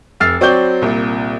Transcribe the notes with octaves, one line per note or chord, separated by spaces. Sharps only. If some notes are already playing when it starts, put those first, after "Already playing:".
F1 E6 F6 A6 C7
F#3 C4 D5 C#6 G6 G7
C2 A#2